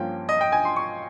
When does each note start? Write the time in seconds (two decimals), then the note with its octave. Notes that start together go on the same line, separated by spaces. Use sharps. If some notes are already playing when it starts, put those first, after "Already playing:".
Already playing: G2 F3 A#3 C#4 G5
0.29 D#5
0.41 G5
0.52 G#5
0.65 C6
0.76 C#6